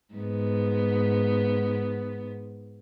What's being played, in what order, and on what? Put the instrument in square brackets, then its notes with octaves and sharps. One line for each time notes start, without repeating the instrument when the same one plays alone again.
[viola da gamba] G#2 B3